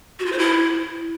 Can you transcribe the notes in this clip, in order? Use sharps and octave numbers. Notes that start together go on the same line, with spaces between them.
F#4
F4
C5
E4